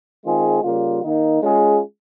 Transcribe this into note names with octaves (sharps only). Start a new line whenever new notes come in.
D#3 G#3 C4 F4 G#4
C#3 G3 A#3 F4
D#3 A#3 D#4
G#3 C#4 F4 G#4